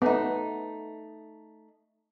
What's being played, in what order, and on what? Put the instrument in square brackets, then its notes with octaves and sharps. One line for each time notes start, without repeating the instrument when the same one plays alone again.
[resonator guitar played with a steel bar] A3 D#4 [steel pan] B3